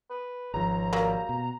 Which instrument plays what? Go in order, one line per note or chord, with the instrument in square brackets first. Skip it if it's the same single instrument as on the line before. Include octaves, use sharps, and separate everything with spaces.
[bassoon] B4
[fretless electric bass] G#1 F3 [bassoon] C#2 [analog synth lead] A#5
[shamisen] F#3 G3 A#3
[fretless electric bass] B2